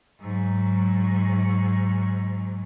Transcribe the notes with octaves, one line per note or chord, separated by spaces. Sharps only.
G#2 F#3